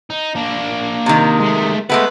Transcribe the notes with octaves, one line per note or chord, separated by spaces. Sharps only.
D#4
A#3 D4
C3 D#3
G#3 A3
G#3 A3 B3 B4